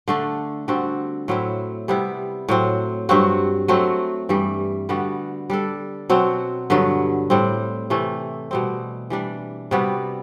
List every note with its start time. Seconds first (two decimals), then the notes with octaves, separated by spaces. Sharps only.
0.08 D3 A3 D4
0.68 D3 G3 C4 F#4
1.28 A2 F#3 C4 E4
1.88 C3 G3 B3 E4
2.48 A2 F#3 C4
3.09 G2 F#3 C4 F#4
3.68 F#3 A3 C4 F#4
4.29 G2 E3 G3
4.89 D3 G3 B3 F#4
5.50 G3 D4 A4
6.09 B2 F#3 C4 F#4
6.70 G2 D3 F#3 B3
7.30 A2 G3 C4
7.90 C3 E3 A3
8.51 B2 G3 C4
9.10 E3 G3 D4
9.71 C3 G3 B3 F#4